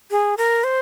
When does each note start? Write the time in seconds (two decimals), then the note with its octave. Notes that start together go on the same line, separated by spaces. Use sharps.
0.11 G#4
0.37 A#4
0.64 C5